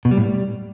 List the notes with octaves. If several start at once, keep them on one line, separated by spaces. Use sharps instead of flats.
B2
G3
A2
G3